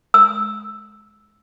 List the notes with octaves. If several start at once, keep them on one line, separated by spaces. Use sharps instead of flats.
E6